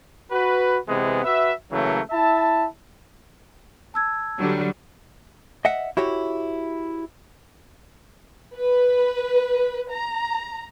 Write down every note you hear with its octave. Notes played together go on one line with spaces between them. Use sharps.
F#4 B4
C3 E3 G#3 B3
F#4 B4 E5
C#3 E3 F#3 A3 A#3
E4 E5 A5
A5 E6 G#6
D3 F#3 G3
D#5 E5 F#5
E4 F#4 G4 C#5
B4
A#5